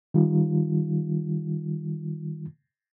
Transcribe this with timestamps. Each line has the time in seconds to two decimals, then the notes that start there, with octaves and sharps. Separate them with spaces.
0.14 D#3 G3 F4